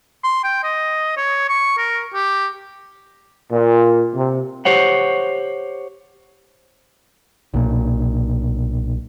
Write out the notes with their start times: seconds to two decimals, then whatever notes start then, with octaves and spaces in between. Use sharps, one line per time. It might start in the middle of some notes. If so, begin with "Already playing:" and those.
0.24 C6
0.44 G5
0.64 D#5
1.17 C#5
1.49 C#6
1.78 A#4
2.14 G4
3.51 A#2
4.15 C3
4.65 G4 C5 C#5 F#5
7.54 B1 A#2